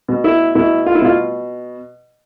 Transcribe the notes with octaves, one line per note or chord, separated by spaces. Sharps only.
B2
E4
B2 E4
F4
E4
B2 F4